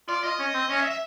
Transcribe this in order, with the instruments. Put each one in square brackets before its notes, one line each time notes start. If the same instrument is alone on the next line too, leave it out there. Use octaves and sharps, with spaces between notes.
[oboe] F4 [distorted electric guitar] D5
[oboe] F4 [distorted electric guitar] D#5
[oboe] C#4
C4
[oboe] C#4 [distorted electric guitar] D#5
[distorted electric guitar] E5
E5